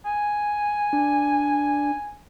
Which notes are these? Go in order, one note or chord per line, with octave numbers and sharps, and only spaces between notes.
G#5
D4